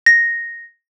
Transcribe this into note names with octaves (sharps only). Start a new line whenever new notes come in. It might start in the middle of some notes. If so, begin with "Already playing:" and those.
A#6